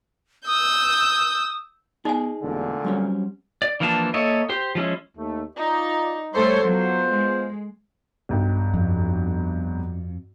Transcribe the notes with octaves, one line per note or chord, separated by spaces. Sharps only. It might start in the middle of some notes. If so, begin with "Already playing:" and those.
D#6 E6 G6
B3 D#4 G#4 D5 D#5 G#5
E1 A#2 D3 A3
F#3 G3 C4 C#4
D5
E3 F3 A#3 D4 A5
A#3 A4 C#5 D#5 E5
G4 C5
F3 G#3 C#4 E4
D#2 A3
D#4 F4 D5
G3 A3 A4 C5 C#5
F#3 B3 F4 C5
G#3
B1 G2 G5
F2